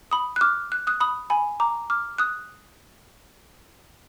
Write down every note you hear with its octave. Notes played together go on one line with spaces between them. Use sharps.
B5 D#6
F#6
D6 F6
F#6
D#6 F#6
B5 D#6
G#5 B5
A#5 D6
D6 F6
D#6 F#6